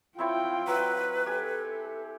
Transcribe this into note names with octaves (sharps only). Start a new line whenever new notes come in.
C4 E4 F4 C#5 G5
F#3 B4
G4 A4 G#5